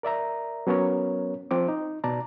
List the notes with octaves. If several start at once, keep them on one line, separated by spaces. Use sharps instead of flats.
A#4 D5 E5 A#5
F#3 B3 C#4 A#4 C#5
F3 C4 D6
D#4
B2 D5 A5 A#5